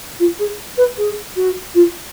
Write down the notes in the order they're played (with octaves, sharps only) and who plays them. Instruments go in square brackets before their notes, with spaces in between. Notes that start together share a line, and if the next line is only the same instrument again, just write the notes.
[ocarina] F4
G#4
B4
G#4
F#4
F4